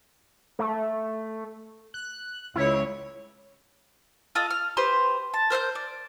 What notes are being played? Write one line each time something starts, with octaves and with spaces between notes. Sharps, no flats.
A3
F#6
C#2 E4 C#5
F4 A4 D#5
F6
G4 B4 C5 C6
A5
A#4 C5 F6 G6
D5